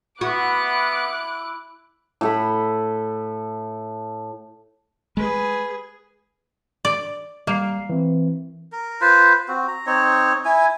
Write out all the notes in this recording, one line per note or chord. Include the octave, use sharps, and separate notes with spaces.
B3 E4 F#4 D6 F#6
A2 A4 B5
G#3 G#4 B4
D5
G3 A#3 C7
E3 C4
A#4
F4 B4 C5
C4 F#4
A#5
C4 D#4 C#5
E4 G#5